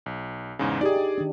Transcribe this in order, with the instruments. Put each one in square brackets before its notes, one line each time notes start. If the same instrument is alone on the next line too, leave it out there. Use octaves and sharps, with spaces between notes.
[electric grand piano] B1
E2 G#2 C#3
[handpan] D#4 G4 [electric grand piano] G#4 D5
[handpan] D4
D#3 D4